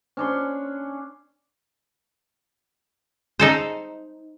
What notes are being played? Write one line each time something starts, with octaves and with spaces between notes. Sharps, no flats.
C#4 D4 C6
D#4 A4 C5